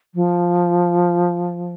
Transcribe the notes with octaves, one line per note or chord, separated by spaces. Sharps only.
F3